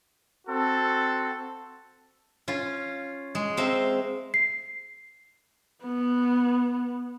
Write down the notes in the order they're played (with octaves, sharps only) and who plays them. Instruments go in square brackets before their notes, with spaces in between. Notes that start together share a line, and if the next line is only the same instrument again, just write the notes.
[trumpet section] C4 F#4 A4
[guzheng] C#4 F4
G#3
C4 E5 F5 A#5
[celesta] C7
[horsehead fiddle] B3